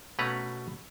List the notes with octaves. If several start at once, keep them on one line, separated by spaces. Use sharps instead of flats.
B2 A3 C#4 B4 A#5